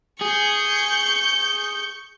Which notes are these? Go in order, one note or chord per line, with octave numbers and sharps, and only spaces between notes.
G#4 C#6 G6